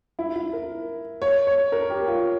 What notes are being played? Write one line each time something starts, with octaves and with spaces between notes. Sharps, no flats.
E4
E4
A#4
C#5
C#5
A#4
G4
F4